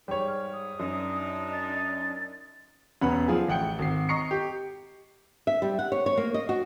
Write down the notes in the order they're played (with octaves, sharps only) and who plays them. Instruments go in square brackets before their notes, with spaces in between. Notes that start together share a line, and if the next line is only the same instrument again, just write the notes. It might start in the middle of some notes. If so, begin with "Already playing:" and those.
[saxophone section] G#2 [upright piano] G3 C#5
[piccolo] F6
D#6
[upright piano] F#2 [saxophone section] D4 D#4
[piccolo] A6
[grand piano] E1 B3 C#4 F#5 B5
F3 G#4
A1 F#5 G5 C#7
G#1 C7
D#5 A#5 C#6 C7 C#7
G4
[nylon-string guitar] E5
G3
F#5
C#5
C#5
A#3
D#5
F#4